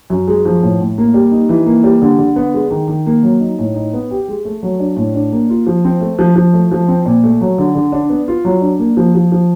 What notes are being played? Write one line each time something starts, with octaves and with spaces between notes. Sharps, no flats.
F#2
G#3
F3
A2
A2
A#3
G3
D#4
E3
A#3
G3
D3
D3
B3
G#3
D#3
D#3
A#3
F#3
D#4
A2
D#4
B3
G4
G#3
A3
F#3
D4
A2
D4
A#3
F4
F3
C4
A3
F3
F3
A3
F3
C4
A#2
A3
F#3
D3
D3
D4
B3
F4
F#3
D4
A#3
F3
F3
F3